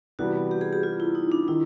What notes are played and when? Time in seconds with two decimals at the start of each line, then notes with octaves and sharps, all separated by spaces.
0.19 C3 E3 G3 B3 F#4
0.51 G4
0.61 G#4
0.73 G4
0.83 F4
1.00 E4
1.15 D#4
1.32 D4
1.48 D#3 E4